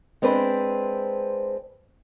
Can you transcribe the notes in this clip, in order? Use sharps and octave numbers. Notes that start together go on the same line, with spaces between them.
G#3 C4 D4 B4 C5